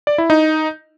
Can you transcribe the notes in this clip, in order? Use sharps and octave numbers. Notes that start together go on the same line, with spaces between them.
D5
E4
D#4